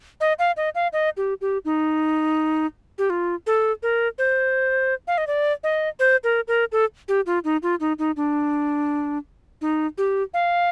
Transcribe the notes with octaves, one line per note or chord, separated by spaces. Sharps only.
D#5
F5
D#5
F5
D#5
G4
G4
D#4
G4
F4
A4
A#4
C5
F5
D#5
D5
D#5
C5
A#4
A#4
A4
G4
F4
D#4
F4
D#4
D#4
D4
D#4
G4
F5